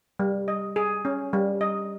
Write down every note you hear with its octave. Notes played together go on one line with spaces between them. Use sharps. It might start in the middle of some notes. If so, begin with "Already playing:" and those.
G3
D#5
G#4
C#4
G3
D#5